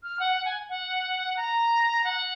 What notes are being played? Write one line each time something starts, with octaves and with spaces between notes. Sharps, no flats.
F6
F#5
F#5
G#5
F#5
A#5
F#5